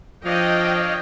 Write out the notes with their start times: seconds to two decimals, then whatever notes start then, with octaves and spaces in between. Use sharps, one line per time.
0.25 F3 D4 C#5 D#5 F5 G5